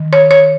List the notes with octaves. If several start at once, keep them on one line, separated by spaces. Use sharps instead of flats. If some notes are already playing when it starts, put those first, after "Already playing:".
Already playing: D#3
C#5
C#5